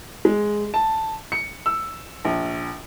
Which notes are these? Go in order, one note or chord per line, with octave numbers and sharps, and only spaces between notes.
G#3
A5
C#7
E6
A#1